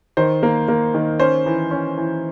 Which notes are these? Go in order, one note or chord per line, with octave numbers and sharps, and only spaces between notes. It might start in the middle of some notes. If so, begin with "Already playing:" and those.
D#3 C5
A#3
A#3
D#3
C#4 C5
E3
C#4
E3